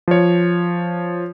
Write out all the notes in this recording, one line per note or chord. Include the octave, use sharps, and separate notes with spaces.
F3 C#5